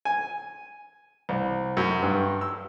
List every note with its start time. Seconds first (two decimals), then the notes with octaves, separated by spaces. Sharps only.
0.05 G#5
1.29 C2
1.77 F#2
2.02 G2
2.41 E6